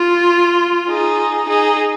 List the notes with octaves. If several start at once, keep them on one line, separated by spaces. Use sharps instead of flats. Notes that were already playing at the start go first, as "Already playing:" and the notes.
Already playing: F4
D#4 G#4
D#4 G#4